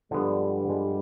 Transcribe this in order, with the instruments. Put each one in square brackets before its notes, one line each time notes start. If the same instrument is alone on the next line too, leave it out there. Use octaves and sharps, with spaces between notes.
[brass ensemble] G2 G3 [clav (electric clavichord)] D3 F3 G#3 B3
[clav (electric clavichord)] D3 F3 G#3 B3